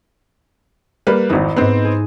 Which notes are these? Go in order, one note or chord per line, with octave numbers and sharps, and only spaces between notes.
G3 A#3 B4
G#1 F2 D#4 E4
G#2 B3 C4 C6
G#4